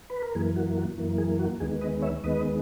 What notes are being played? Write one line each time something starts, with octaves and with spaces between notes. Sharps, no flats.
B4
A#4
F#2 E3 A#3 G#4
F#4
F#4
F#2 E3 A#3
G#4
F#4
D#2 D#3 G#3 B3 G#4
B4 D#5
C#5 E5
D#2 D#3 G#3 B3 B4 D#5